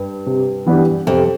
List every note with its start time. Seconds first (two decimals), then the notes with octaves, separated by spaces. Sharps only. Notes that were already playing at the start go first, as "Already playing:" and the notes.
Already playing: G2
0.26 C3
0.66 E3 B3 D4 G4
1.07 F2 C3